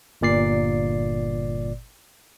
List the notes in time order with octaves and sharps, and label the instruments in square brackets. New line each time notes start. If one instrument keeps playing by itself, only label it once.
[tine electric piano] G1 A#2 D5 C7